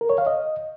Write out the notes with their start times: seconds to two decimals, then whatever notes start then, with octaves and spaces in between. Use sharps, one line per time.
0.01 A#4
0.10 C#5
0.18 F5
0.27 D#5